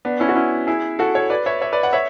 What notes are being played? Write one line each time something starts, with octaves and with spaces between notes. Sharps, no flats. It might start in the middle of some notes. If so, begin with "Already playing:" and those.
B3 D4
C#4 E4
F#4
C#4 E4
E4 G#4
F#4 A4
A4 C#5
B4 D5
C#5 E5
C#5 E5
B4 D5
D5 F#5
C#5 E5